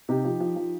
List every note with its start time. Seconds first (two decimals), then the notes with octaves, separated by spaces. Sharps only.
0.09 C3 D#4 G4
0.24 F3
0.40 F3
0.56 F3